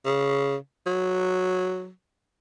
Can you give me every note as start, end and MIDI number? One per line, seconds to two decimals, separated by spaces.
0.05 0.56 49
0.86 1.89 54